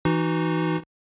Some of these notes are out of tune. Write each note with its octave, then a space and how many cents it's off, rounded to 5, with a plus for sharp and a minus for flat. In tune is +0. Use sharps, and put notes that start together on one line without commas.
E3 +0 D#4 -10 F#4 +0